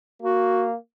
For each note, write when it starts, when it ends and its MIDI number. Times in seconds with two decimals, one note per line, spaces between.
0.22 0.75 58
0.22 0.68 66